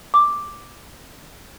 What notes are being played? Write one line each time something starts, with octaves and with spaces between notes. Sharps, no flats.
D6